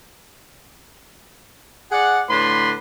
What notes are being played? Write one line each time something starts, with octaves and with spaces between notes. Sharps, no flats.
G#4 D5 F#5
A2 D3 B4 B5 C6